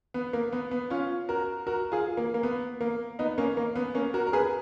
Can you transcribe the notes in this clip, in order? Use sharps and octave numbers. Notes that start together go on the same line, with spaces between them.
B3
A#3
B3
B3
C#4 F4
F#4 A#4
F#4 A#4
F4 G#4
A#3
A#3
B3
A#3
B3 D#4
A#3 C#4
A#3
B3
A#3 C#4
F#4 A#4
A#4
G#4 B4